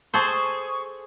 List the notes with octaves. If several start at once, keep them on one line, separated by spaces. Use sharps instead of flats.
G#4 A4 C5 C#6